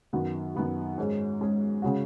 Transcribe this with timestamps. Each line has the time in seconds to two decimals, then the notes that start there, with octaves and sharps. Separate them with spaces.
0.13 F#2 D#3 B3 F#4
0.55 F#2 D#3 B3 F#4
0.98 G#2 G#3 C#4 G#4
1.41 G#2 G#3 C#4 G#4
1.82 C#3 G#3 C#4 F#4